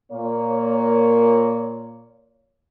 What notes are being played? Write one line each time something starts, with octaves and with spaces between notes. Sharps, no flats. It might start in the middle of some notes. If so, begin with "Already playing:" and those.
A#2 A#3 C#5